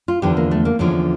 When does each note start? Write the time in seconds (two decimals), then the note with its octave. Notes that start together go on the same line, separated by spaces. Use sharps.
0.08 F4
0.22 E2 D3 F3 G4
0.37 A#3
0.51 A3
0.65 A#3
0.79 E2 D3 F3 C#4